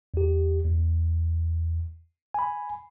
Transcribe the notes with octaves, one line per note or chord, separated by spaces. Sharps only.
E2 G4
E2
G#5 B5